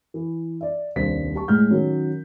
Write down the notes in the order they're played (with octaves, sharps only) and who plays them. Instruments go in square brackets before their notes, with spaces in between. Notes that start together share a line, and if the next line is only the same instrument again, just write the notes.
[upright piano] E3
D5 E5
D#1 C2 G2 C5 B6
G4 A5 C#6
A2 G#3 F6 G6
D#3 F#3 C#4